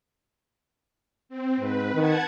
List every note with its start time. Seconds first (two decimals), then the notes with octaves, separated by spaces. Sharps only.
1.29 C4
1.59 G#2 B4
1.94 D#3 F#5 A5 G#6